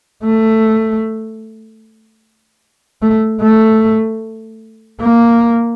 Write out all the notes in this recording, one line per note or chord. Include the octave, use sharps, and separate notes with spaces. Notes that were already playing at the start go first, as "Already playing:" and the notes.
A3
A3
A3
A#3